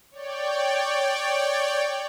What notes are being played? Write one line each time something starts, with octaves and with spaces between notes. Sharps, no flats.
C#5 D5 G5